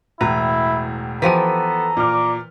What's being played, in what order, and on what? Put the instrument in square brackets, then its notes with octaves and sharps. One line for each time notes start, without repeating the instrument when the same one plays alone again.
[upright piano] E1 A2 A#5 [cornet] E4 [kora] B4
[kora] E3 F3 G4 [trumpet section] B3 A4 [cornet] A#5 [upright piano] B6 D#7
[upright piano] A#2 F6 [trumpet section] D5 D6